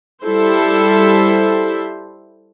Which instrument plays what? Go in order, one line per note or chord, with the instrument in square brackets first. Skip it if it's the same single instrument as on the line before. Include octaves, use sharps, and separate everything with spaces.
[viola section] G3 E4 A4 C5